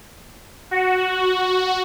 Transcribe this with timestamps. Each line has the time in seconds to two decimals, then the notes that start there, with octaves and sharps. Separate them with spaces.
0.71 F#4